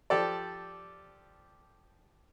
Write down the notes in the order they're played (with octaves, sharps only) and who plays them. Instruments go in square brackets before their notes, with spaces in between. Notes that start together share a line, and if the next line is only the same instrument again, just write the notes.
[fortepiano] F3 G4 A4 D5